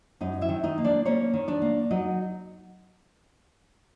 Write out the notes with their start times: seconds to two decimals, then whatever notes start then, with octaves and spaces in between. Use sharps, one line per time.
0.21 F#2 D#4 D#5
0.41 E4 E5
0.49 D#3
0.63 D#4 D#5
0.78 A#3
0.84 D4 D5
1.05 A#3 C#4 C#5
1.34 D#3
1.48 D4 D5
1.62 A#3
1.90 F#3 D#4 D#5